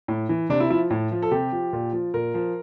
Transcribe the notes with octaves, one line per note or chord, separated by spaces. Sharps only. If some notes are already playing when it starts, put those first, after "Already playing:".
A2
E3
C3 D4
E4
F3 E4
A2
F3
A4
C3 G4
F3
A#2
F3
A#2 A#4
F3